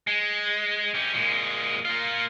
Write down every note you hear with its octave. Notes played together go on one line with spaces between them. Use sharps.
G#3
C#4 G4
A#2 G#3
A#3 F4